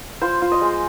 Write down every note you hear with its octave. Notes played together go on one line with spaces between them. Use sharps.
F4 C5
F4
D#5
G#3